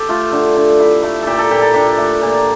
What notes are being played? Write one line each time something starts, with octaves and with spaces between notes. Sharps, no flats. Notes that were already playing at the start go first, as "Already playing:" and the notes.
Already playing: G4 A4
A3 F4
D3
D3
E4
A3
A#2 G4 A4
A4
A#2 G4
A4
D4 G4
A3
A#2